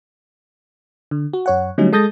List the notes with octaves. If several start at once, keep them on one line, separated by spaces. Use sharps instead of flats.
D3
F#4
F#2 C#5 F#5
D3 F#3 G3 A3 C#4 D#4
G#3 A4 D#6 G6 A6 A#6